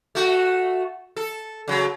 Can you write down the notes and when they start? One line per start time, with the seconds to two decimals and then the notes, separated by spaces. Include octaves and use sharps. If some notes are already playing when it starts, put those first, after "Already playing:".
0.15 A3 F#4
1.16 A4
1.68 C#3 F#3